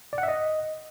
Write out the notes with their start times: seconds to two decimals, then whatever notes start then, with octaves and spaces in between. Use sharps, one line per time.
0.13 D5
0.18 F#5
0.23 E5
0.28 D#5